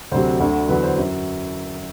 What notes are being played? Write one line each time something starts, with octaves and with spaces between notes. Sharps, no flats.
D2 C3 F#3 C5
D2 D3 F#3
E2 D3 F#3 B4
C5
F#2 F#3